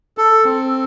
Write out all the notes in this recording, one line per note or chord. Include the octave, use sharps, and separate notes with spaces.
A4
C4